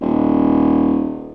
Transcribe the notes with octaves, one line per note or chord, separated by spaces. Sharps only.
D#1